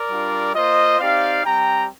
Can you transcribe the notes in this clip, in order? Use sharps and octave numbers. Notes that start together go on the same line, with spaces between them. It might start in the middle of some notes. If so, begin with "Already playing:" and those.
Already playing: A#4 D5
G3 D4 F4
A#3 F4 C5 D#5
C4 D#4 G4 D5 F5
G3 C4 G4 G5 A#5